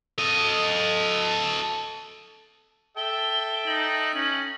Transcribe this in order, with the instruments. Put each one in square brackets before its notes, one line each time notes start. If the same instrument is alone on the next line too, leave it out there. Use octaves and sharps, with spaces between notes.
[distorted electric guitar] A4 D#5
[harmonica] A4 E5 G5 [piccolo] G7
[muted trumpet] D#4 [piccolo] F#7
[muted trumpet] C#4